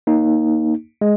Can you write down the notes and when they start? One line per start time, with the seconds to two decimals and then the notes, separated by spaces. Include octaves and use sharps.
0.07 A#3 D#4
1.01 G#3